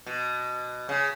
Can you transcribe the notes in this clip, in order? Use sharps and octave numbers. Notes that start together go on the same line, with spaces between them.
B2
C#3